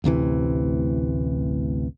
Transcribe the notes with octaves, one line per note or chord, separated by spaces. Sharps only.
A1 D2 C3 E3